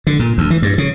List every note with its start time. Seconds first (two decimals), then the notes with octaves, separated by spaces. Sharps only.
0.07 D3
0.20 A#2
0.38 D2
0.50 E3
0.62 G2
0.78 C#3